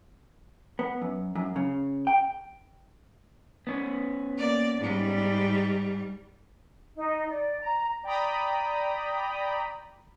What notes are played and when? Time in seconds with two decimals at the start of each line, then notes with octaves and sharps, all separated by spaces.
0.79 B3
1.02 F#2
1.35 F#2
1.56 C#3
2.07 G5
3.67 B3 C#4
4.38 A#3 D5
4.78 G#2 G3
6.96 D#4
7.29 D5
7.61 A#5
8.03 D5 G5 A#5 B5 D#6